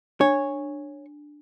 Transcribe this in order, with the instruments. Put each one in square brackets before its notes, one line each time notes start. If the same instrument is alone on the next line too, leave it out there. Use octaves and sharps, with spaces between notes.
[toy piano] D4 [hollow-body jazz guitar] C#5